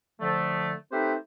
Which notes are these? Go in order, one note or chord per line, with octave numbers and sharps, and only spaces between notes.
D3 F3 A3
A3 C4 D#4 G4 B4 C5